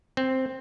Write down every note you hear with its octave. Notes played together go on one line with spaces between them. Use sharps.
C4